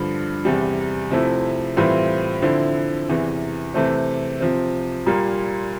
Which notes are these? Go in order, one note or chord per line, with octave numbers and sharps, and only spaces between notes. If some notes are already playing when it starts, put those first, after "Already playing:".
Already playing: G2 D3 F3
E2 C3 G3
C3 F3 A3 C4 E4
A2 E3 G3 C4 F4
D3 F3 C4 E4
E2 C3 E3
C3 E3 A3 C4
C3 F3 C4
A#2 G3 A#3 F4